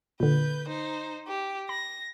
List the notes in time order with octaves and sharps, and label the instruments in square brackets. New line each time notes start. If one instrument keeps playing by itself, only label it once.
[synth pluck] A#2 D3 [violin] B4 G6
[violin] D#4 C5
G4
[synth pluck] B5 [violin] A#6